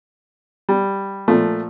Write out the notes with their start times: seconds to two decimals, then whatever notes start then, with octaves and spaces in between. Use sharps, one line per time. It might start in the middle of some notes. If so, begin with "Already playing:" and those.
0.69 G3
1.28 A#2 F3 A3